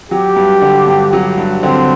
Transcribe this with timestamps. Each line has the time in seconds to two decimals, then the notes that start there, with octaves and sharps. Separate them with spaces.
0.11 F#3 G4
0.36 G2
0.62 D3
0.88 G2
1.13 F#3
1.38 G2
1.63 D3 C4